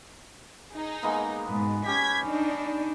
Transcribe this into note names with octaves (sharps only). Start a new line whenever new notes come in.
D#4 G#4
G#3 A#3 B3
G#2 B2 B4
C#4 G4 G#6 B6
D4 D#4